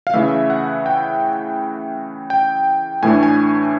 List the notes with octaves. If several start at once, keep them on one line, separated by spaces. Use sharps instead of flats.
F5
C#3 E3 A3 E5
F#5
G5
G5
A2 E3 A3 D4 G#5
G#5